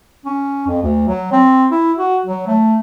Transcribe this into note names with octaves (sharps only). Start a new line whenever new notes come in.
C#4
F2
D2
F#3
C4
E4
F#4
F#3
A3